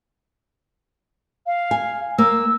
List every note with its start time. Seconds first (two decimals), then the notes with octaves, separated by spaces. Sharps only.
1.46 F5
1.71 G#5
2.18 A#3 E6